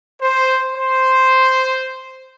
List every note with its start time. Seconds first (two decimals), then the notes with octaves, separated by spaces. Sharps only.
0.21 C5
0.75 C5